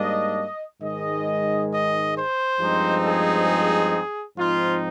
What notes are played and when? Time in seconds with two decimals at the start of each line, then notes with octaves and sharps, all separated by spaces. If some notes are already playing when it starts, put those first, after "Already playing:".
Already playing: G#2 G3 A#3 D4 D#5
0.82 G#2 D#3 G#3 D#5
1.70 D#5
2.16 C5
2.60 G2 F3 G#3 C4 D#4
3.04 G#4
4.37 G#2 F3 C4 D#4 F4